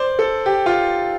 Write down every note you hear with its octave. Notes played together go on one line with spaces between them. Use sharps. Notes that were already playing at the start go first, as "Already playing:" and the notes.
Already playing: C5 D5
A4
G4
F4